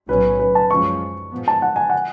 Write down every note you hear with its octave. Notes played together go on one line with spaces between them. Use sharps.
B1 A2 F#3 C#4 B4
B4
A5
F#2 F3 G#3 C#4 C#6
G#2 F3 B3
A5
F#5
G#5
F#5